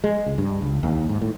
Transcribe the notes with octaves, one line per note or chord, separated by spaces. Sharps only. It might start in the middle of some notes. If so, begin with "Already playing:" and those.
G#3
C#2
G2
C#2
D#2
G#2
A2